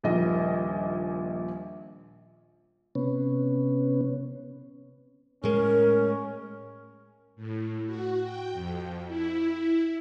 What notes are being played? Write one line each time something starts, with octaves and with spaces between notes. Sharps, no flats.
D#1 A#1 A#2 D#3 D#5
C3 B3 C#4
A2 G#3 C#4 A#4
A2
F#4
G5
F2
E4